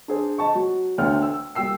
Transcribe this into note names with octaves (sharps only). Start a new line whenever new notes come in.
D4 G#4 C5
D#5 A5 C#6
F#3
D2 D3 C#5 G5 F6
E6
D#2 G3 G5 E6 C7